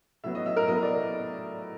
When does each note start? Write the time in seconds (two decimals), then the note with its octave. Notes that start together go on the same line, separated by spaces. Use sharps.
0.24 A2 F#3 B3 E5
0.35 D#5
0.46 E5
0.57 A#4
0.67 A2 F#3 B3 D#5
0.83 D5